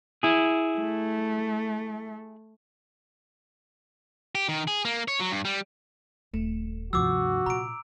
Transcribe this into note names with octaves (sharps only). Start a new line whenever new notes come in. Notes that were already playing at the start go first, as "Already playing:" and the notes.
E4 G#4
A3
G4
D#3
G#4
A#3
C#5
F#3
G2
G3
D#1 A3
D2 G2 C3 F3 F#4 D6 E6
A#2 A#5 D7